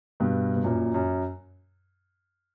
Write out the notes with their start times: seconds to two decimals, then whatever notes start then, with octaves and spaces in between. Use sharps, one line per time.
0.20 G2 B2
0.56 B2
0.64 F#2 A#2
0.94 F#2